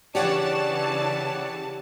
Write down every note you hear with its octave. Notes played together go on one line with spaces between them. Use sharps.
C#3 E3 D4 G4 C#5 D5 F#5 A5